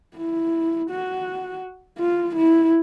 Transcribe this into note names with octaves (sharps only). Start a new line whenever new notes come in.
E4
F#4
F4
E4